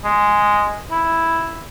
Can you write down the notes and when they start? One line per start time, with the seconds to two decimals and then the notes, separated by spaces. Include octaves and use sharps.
0.04 G#3
0.91 E4